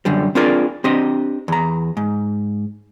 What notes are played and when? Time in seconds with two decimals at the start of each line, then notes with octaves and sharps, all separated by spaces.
0.05 F#2 D3 G3
0.35 C4 D4 F4 G#4 A#4 D5
0.84 C4 D4 G4 D#5
1.48 E2 A#5
1.97 G#2